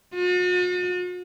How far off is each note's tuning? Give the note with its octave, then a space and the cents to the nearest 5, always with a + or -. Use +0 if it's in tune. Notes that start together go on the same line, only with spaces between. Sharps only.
F#4 -45